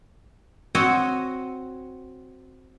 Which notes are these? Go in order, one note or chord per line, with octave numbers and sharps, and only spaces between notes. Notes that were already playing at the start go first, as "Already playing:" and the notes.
C4 F#4 C#5 D#5